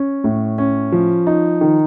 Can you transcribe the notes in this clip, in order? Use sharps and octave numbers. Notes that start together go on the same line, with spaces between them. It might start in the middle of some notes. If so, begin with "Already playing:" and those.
Already playing: C#4
A2
C#4
F3
D#4
D#3